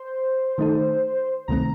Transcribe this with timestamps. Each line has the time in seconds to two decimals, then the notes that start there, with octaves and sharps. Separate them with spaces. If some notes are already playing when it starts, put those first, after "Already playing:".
Already playing: C5
0.58 D#3 A3 D#4 A4
1.48 C#2 C3 D#3 A3 C4 A#5